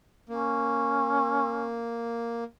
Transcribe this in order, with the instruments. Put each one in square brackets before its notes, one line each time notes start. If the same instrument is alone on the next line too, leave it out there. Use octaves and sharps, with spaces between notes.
[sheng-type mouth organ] A#3 [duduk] C#4